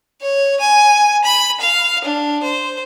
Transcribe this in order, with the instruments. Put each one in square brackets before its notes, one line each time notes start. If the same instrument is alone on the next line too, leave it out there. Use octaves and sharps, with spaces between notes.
[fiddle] C#5
G#5
B5
F5
D4
C5